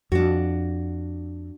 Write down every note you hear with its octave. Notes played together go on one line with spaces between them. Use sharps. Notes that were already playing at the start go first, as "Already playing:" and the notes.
F2 D4 F#4